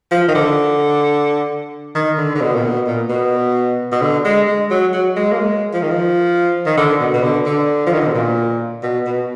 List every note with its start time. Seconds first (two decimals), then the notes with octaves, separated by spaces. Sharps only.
0.11 F3
0.28 D#3
0.35 D3
1.95 D#3
2.18 D3
2.35 D3
2.41 B2
2.55 A#2
2.64 B2
2.87 A#2
3.09 B2
3.92 B2
4.02 D3
4.25 G#3
4.48 G#3
4.71 F#3
4.93 F#3
5.16 G#3
5.32 A#3
5.39 G#3
5.74 F3
5.82 D#3
5.90 F3
6.66 D#3
6.77 D3
7.00 B2
7.14 B2
7.23 D3
7.46 D3
7.87 F3
7.93 D#3
8.00 D3
8.07 B2
8.14 A#2
8.83 B2
9.07 B2